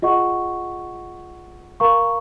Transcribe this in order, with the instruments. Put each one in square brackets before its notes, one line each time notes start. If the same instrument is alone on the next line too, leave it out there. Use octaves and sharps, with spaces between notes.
[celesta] F4 G#4 D#5 F#5 C#6
A#4 F5 A#5 C#6